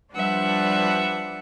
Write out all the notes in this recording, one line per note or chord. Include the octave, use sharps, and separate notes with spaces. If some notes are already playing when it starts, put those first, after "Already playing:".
F3 G3 D4 B4 E5 F#5